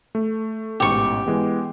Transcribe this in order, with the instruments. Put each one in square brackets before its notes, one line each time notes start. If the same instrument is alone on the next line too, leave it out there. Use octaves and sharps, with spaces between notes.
[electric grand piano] A3
[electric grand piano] A1 G#2 B2 [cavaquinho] G4 C#6
[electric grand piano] E3 G#3 B3